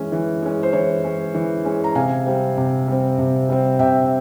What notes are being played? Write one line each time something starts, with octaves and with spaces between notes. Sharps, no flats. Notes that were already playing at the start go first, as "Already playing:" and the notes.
Already playing: E3 G#3 C#4
E3
G#3 C#4
C5
E3 C#5
G#3 C#4
E3
G#3 C#4
A#5
C3 F5 G#5
G3 C4
C3
G3 C4
C3
G3 C4
C3 E5 G5